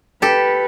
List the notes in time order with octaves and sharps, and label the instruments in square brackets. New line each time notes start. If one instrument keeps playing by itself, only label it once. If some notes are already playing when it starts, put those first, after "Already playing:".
[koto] G4 A4 [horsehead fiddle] B4